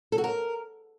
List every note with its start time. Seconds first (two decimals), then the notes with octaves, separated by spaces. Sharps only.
0.12 A4
0.18 F#4
0.24 A#4